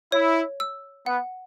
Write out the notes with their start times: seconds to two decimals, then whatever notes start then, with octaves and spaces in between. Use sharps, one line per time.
0.12 E4 C#5
0.60 E6
1.06 B3 F#5